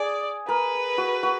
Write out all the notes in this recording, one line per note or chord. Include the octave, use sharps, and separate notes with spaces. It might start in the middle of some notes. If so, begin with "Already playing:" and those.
Already playing: G#4 D5
A#4 B4
F#4
F#4